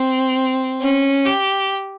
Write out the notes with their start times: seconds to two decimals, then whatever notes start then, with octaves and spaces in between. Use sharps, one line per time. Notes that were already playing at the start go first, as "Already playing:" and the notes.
Already playing: C4
0.81 C#4
1.26 G4